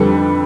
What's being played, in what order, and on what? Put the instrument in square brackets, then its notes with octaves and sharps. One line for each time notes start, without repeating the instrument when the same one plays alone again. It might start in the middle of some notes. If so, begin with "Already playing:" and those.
Already playing: [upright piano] F2 D3 G3 A4 B4